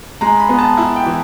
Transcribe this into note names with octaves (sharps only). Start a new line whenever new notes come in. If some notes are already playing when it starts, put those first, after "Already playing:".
G#3 A#5
B5
B3
A5
E4
G5
E3